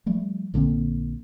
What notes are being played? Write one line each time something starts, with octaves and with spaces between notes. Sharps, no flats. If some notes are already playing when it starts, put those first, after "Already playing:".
F3 G3 A3
A#1 D3 A#3 C4